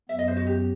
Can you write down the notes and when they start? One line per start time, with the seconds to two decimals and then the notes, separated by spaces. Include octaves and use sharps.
0.09 F#2 F#3 B3 E5
0.19 D#5
0.28 C5
0.37 F#4
0.47 G4